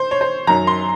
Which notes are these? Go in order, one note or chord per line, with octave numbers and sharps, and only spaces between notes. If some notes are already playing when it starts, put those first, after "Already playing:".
Already playing: C5
C#5
C5
F#2 D#3 F#3 A#5
C6